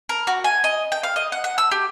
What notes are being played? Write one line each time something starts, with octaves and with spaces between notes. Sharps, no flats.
A#4
F#4
G#5
D#5
G5
F5
D#5
F#5
F#5
E6
G4